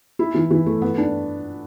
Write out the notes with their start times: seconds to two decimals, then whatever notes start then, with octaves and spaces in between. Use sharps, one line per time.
0.19 E4
0.35 E3
0.51 E3
0.66 A3
0.82 B3
0.98 D4